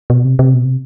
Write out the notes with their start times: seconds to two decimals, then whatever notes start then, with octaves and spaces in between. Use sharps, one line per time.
0.10 B2
0.25 C3
0.39 C3
0.54 B2
0.65 C3